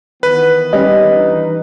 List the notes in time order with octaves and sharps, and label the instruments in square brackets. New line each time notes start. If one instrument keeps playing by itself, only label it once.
[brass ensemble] D#3 E3 B3 [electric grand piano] B4
[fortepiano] G3 C#4 [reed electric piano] D#5
[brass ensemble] E3 D4 D#4